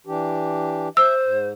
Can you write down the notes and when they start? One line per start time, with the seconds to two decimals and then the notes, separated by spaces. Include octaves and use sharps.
0.07 E3 D4 G4
0.97 C5 E5 E6
1.24 G#2